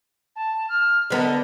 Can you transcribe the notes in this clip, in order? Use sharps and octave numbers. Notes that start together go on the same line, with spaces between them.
A5
F6
D3 B3 A#4 D#5